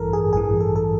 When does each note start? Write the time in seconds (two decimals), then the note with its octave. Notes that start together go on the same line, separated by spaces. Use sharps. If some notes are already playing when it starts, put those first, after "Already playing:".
Already playing: A1 G2 E3 A4 A#4
0.13 G#4
0.33 A1 G2 E3 G#4
0.60 A4
0.76 A4